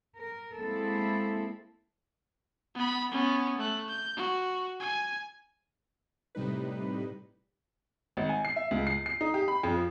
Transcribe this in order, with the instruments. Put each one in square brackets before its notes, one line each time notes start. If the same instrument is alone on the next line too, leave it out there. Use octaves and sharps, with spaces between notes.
[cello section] A#4
G#3 A#3 C4 E4 A4
[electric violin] B3 B5
B3 C#4
A3 F#6
G6
F#4
G#5
[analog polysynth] A2 C3 G3 D#4 B4
[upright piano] G#1
G#5
C7
E5
C#2
C7
C7
D#4
G4
B5
F2
F3